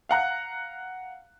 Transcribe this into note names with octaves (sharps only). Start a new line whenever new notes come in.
F5 F#5 A#5 F#6